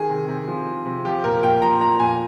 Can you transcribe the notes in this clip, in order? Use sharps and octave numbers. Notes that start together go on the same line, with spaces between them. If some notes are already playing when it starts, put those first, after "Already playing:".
Already playing: D#3 G#4
C3
C3
F3
C3
C3
F3 G4
A#2 A#4
A#2 G5
F3 A#5
A#2 A#5
A#2 G#5